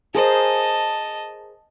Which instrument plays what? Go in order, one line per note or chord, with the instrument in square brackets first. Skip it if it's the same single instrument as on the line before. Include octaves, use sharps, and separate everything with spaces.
[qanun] G#4 A#4 C5 [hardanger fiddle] D#5 A5